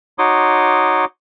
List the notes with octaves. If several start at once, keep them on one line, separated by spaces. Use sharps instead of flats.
D#4 F#4 C#5 C6 D6 D#6